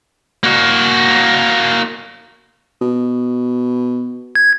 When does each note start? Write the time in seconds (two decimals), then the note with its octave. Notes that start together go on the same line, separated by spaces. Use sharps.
0.43 A#3 F#4
2.81 B2
4.35 G#6